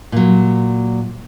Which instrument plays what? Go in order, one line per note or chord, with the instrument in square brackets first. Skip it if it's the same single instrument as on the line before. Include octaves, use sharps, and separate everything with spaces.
[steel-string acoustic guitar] A#2 F#3